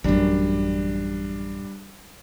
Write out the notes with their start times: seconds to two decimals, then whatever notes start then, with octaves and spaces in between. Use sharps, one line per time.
0.04 A1 F#2 G3 D4